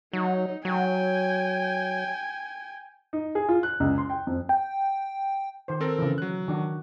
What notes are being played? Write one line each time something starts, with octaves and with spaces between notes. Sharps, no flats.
F#3 D#4
F#3 G5 G#5
D#4
G#4
F4
F#6
C#2
C6
G5
F2
G5
D#3 C5
C4 A4 A#4
C#3 E3
F#3 F#6
D#3 D4 F#4